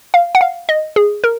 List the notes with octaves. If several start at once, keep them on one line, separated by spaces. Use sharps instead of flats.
F5
F#5
F5
D#5
G#4
A#4